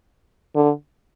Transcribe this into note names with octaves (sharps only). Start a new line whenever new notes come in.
D3